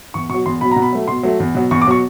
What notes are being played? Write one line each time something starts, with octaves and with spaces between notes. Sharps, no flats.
E2 C#6
B2 F#3 C#6
E2 C6
B2 F#3 B5
B2 A#5
B5
F#3 A3
B2 C6
F#3 A3
E2
B2 F#3
E2 C#6
D6
B2 F#3 C#6